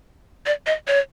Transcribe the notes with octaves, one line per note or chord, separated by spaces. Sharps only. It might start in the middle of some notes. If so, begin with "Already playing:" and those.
D5
D#5
C#5